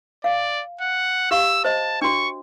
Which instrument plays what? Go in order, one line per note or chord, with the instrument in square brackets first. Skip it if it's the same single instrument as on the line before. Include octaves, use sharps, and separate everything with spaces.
[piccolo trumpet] D5 [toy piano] F5
[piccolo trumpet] F#5
[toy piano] G4 F5 C#6 [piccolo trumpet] E6
[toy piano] C5 D#5 [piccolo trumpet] A5
[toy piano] D4 F#4 [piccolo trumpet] C#6